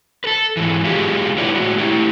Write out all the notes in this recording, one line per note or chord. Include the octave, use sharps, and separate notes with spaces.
A4 B4
G#2 E3
G#3 D#4 F4 G4 G#4
D3 E4 G4 B4 C#5 D5
A2 G#3 F#4
A3 E4 G4